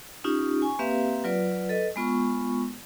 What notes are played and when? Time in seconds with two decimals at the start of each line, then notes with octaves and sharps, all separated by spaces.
0.24 C#4 D#4 F4 G4
0.62 G#5 C#6
0.79 A#3 C4 G4 B4 E5 F5
1.24 F#3 F4 B4 D5
1.69 A4 B4 D#5
1.96 G#3 B3 F4 C#6